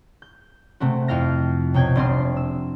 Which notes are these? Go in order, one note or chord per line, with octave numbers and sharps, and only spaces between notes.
G6
C3 A3 C4 F#4
F2 E4 F5 G5 F6 A#6
B1 C3 G5 G6 G#6
F1 G3 C4 D4 F4 C6
E6